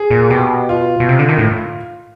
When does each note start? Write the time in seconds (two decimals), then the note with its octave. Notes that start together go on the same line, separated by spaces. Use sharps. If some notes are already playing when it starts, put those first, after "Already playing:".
Already playing: G#4
0.10 A#2
0.30 B2 G4
0.69 F4
1.00 B2
1.09 C3
1.19 D3
1.29 D#3
1.38 A2